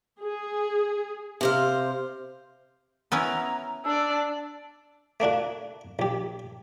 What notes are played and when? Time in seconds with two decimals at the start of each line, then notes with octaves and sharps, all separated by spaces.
0.19 G#4
1.41 C3 C5 F5
3.12 B3 C#4 E4 A#5
3.85 D4 D5 E6
5.20 A3 A#3 D4 F#4
5.99 A#1 G4